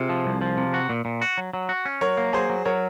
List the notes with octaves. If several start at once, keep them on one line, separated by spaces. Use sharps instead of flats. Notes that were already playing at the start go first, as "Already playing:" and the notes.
Already playing: C3 F4 G#4
F3
C2
F3
C3
F#4
A#2
A#2
F#4
F#3
F#3
F#4
C#4
F#3 A#4 C#5
A#3
F#3 G#4 C5
F#3
F#3 A#4 C#5